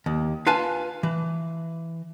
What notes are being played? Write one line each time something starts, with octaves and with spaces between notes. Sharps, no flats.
D#2
F4 B4 F5 G#5 A5
E3